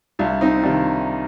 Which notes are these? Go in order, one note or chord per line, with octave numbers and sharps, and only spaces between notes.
C2 D4 F4
C4 D#4
C3 D#3 D4 F4